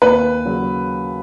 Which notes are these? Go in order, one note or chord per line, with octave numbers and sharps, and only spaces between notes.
D#2 B4
C#3 F#3